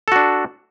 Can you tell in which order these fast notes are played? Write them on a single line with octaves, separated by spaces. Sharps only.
A4 F#4 D4